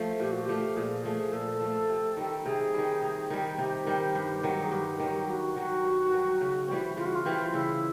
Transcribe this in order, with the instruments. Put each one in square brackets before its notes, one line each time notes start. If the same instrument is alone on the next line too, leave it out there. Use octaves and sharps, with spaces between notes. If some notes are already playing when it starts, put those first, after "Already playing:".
Already playing: [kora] F3 A3
[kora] A#2 [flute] G4
[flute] F#4
G4
[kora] F3 A3
[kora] A#2 [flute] G#4
[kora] F3 A3 [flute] G#4
[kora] A#2 [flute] A4
[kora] F3 A3
C3
D#3 G3
[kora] C3 [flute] G#4
[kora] D#3 G3
C3
D#3 G3
[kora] C3 [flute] G4
[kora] D#3 G3
G2
D#3 F#3
[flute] G#4
[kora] G2 [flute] G4
[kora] D#3 F#3
[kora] G2 [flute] F#4
[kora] D#3 F#3 [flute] F#4
[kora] G2
D#3 F#3
C#3
E3 G3 C4
[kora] C#3 [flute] F4
[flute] F#4
F4
[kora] E3 G3 C4
[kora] C#3 [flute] E4